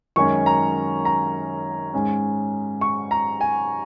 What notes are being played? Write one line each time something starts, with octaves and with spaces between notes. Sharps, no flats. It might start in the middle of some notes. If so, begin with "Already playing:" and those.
F#2 D#3 G#3 C#4 C#6
A#5
A#5
G#2 G#3 C#4
C#6
A#5
G#5